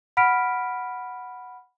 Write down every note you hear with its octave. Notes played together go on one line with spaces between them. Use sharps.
F#5 B5 F6 B6 D7